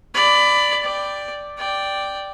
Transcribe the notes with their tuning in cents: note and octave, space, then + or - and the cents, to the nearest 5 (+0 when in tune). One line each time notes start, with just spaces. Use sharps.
D5 +0 B5 +15
D5 +0 G5 +5
D5 +0 G5 +0